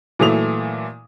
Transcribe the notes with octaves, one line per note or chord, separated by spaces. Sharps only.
A#2 E3 F#3 A3 D#6 F7